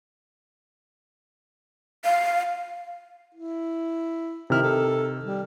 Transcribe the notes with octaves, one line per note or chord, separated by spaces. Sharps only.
F5
E4
C3 D#3 E4 F6
A4
G3